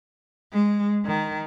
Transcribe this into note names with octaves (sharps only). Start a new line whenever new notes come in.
G#3
D#3